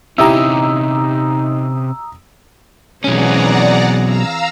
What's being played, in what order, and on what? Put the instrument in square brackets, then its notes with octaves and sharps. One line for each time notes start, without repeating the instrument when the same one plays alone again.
[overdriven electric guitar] C3 C#4 [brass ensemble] D#4 [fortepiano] E4 G4 [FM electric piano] A#5 D#6 E6
[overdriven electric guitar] B1 C#4 [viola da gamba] E3 C4 G#4 [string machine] D5 F#5 A#5
[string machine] F5 A#5 E6